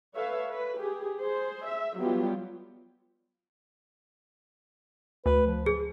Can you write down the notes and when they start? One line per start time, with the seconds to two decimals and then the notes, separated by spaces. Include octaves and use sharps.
0.14 A4 B4 C#5 E5 F5
0.47 B4
0.78 G4 G#4
1.20 G#4 C5
1.67 E5
1.99 F#3 G3 B3 F4 G4
5.26 D2 B4
5.47 F3
5.66 G#4